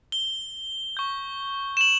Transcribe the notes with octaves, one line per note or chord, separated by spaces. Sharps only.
G7
C#6 G6
E7
F#7